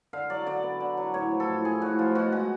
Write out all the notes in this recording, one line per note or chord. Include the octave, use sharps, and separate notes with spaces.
D3 F5
F#3 D5
D3 D5
B3
D3
F#3
A2 C#5
F3
A4
A2
A3 G#4
A2 F#4
F3 F4
B2 F#4
G#3 F#4